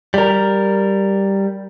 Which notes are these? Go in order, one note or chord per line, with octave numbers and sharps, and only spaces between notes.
G3 A#4